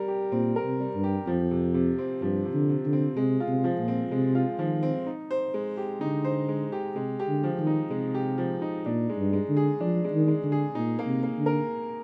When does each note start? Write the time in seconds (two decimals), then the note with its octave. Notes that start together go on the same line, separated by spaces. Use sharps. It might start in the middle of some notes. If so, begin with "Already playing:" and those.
Already playing: G3 A#4
0.08 G4
0.32 A#2 C4
0.56 A#4
0.64 C3
0.80 G3
0.95 G2
1.04 G4
1.26 F2 F3
1.51 C3
1.74 C3
1.98 C4
2.22 G2 F3
2.45 C3
2.54 D3
2.69 C3
2.86 D3
2.93 C4
3.17 C3 G#3
3.40 F4
3.48 C3
3.64 F3
3.80 A#2
3.88 C4
4.11 C3 G#3
4.35 F4
4.59 D#3 F3
4.83 C4
5.06 D#4
5.31 C5
5.54 G#3
5.77 G4
6.01 D3 D#4
6.25 C5
6.49 G#3
6.72 G4
6.96 C3 G#3
7.20 G4
7.28 D3
7.43 F3
7.59 D#3
7.67 D#4
7.90 C3 G#3
8.15 G4
8.38 F3
8.62 D#4
8.86 A#2 D4
9.10 G#3
9.18 G2
9.33 G#3
9.49 D3
9.57 G#4
9.80 F3 D4
10.04 G#3
10.13 D#3
10.28 G#3
10.43 D3
10.52 G#4
10.75 A#2 D#4
10.99 A#3
11.06 C3
11.23 A#3
11.38 D3
11.46 A#4